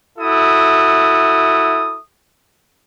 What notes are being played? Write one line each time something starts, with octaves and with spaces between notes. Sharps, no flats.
E4 F#4 A4 E5 D#6